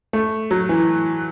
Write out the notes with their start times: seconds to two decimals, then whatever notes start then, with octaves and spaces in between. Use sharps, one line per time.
0.13 A3
0.51 F#3
0.69 E3